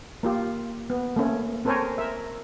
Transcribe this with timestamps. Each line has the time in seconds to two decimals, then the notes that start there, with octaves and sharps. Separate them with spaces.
0.23 A#3 F4 G4
0.90 B3
1.16 A3 A#3 C#4
1.65 C4 A4 A#4 C5 C#5 G#5
1.98 A#4 E5